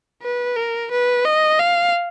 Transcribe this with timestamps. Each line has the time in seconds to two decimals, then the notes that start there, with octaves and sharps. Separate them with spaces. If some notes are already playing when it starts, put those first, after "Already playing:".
0.23 B4
0.56 A#4
0.91 B4
1.25 D#5
1.60 F5